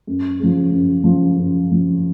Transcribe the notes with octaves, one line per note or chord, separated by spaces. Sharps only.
F#2
C#3 F3
F#2
C#3 F3
F#2
C#3 F3